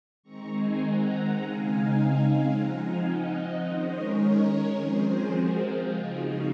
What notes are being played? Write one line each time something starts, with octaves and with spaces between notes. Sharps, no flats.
D#3 G#3 C4 A#5 C#6
G#5 C6
F#5 A#5
C#3 G#3 C4 D#4 F5 G#5
F3 C4 D#4 F#5 A#5
F5 G#5
D#5 F#5
D#3 G#3 C#4 C5 D#5
A#4 C#5
F3 G#3 C4 G#4 C5
F#4 A#4
F4 G#4
C#3 F3 C4 D#4 F4 G#4
F#4